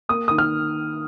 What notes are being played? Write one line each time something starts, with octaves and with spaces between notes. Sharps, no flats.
A#3 D#6
D#3 D#6
F6